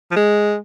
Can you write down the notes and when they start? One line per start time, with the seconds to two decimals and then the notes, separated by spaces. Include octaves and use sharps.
0.11 F3
0.16 G#3